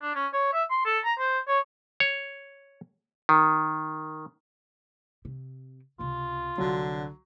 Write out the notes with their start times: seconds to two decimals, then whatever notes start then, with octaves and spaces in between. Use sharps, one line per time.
0.02 D4
0.15 C#4
0.33 C#5
0.53 E5
0.70 C6
0.85 A4
1.04 A#5
1.19 C5
1.48 C#5
2.00 C#5
3.29 D#3
5.25 C3
5.99 C#2 C3 F4
6.58 C2 D3 F#3 D4